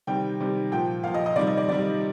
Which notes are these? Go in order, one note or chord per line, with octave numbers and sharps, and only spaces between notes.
C3 D#3 G3 G5
C3 D#3 G3
A#2 F3 G5
A#2 F3 F5
D#5
D#5
C3 D#3 G3 D5
D#5
D5
C3 D#3 G3 D5